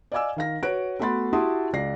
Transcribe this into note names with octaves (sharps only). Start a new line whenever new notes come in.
D5 D#5 F5 G#5 D6 E6
D#3 F5 A#6
F#4 B4 C#5 F#6 D7
A3 B3 F#4 B5 C6 A6
E4 F#4 G4 A5 C6 D#6
C#2 D5 A#6 C7